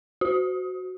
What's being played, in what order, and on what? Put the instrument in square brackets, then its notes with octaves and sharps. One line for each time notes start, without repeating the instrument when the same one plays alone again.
[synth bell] F#4